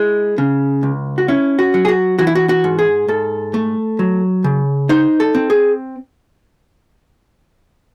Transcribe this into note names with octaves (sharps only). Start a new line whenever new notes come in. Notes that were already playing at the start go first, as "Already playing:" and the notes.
Already playing: G#3 E4
C#3
C#2
F#4
C#4 E4
F#4
F#3
G#4
F#4
E3 F#4
E4
F#4
F#4
G#2
G#4
G#2 A4
A3
F#3
C#3
D#4 C5
A4
C4
G#4